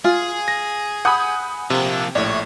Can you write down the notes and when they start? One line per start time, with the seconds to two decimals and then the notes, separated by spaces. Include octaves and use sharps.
0.04 F4 G#4
0.48 A#6
1.05 F#5 G#5 B5 D#6 G6
1.70 C3 F3 A#3
2.15 A#1 A2 E4 C#5 D5